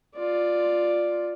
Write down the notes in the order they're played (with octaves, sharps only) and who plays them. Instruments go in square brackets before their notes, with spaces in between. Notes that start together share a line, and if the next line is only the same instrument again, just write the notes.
[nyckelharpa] F4 D5